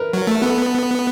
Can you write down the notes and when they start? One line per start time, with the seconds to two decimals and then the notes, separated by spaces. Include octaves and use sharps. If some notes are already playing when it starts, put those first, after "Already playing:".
Already playing: A#4 B4
0.13 F#3
0.27 A3
0.41 B3 A4